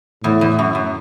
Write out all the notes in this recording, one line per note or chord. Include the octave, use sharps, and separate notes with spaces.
E2 A2
E2
F#2
F#2